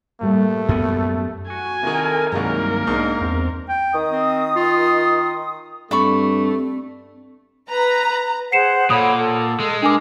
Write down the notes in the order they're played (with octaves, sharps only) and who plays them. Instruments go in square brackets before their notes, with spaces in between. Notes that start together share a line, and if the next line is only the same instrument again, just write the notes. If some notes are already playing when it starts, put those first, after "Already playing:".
[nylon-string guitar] A2 G3 A#3 [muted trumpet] A3
[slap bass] F#2 B3
[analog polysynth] F#4 [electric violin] G#5
[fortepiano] C3 D#3 [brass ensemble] A4 A#4
[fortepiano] C2 G#3 [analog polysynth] G2 D#3 F#3 [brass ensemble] A#3 [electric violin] A#4
[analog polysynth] B1 D4 D#4 [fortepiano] G#2
[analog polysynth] E2 C4
[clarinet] G5
[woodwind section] D#3 D#6
[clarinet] C4
F4
[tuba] G2 [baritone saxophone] A3 [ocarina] C4 [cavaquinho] D5 B5 C#6
[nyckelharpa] B4 [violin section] A#5
[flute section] G#4 C5 F#5 [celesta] C7 C#7 E7
[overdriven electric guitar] A#2 [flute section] A4 C#5 B5 [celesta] F#5 D#6
[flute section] A4
[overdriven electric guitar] G#3
[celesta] D4 G#5 D6 [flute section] A#4